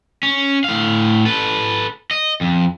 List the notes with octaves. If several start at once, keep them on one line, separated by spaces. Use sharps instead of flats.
C#4
A2 F5
A4 B4
D#5
F2